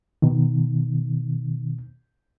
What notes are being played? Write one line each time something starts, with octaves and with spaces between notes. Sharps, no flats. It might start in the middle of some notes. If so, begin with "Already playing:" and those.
B2 D#3